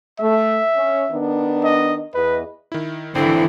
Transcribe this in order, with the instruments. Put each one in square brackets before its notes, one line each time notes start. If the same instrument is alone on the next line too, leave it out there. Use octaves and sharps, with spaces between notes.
[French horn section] A3 [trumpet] E5
[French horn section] C#4
D#3 B3 D4
[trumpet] D#5
[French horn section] E2 D#5 [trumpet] B4
[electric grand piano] D#3 E4
[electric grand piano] G#1 [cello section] D3 E3 [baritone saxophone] C4 [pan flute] E4